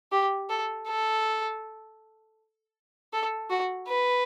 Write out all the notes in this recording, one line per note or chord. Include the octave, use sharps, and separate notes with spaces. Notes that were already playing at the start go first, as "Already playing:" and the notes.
G4
A4
A4
A4
F#4
B4